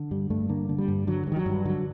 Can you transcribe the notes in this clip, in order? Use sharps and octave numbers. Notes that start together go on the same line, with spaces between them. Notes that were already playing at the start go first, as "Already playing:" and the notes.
Already playing: D3
G2 G3
G2 A3
D3 A#3
D3
G3
G2
D3 F#3
G2
D#3
F#3
G2
D3 F#3